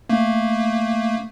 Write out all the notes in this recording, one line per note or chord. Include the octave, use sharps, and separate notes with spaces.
A3 A#3